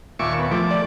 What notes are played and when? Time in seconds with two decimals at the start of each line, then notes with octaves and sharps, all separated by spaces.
0.19 D#2 A#2 E5 C#6 D6
0.39 B3
0.51 F3 A3 D6
0.71 D5